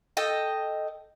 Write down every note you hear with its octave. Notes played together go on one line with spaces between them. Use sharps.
A4 D#5 G5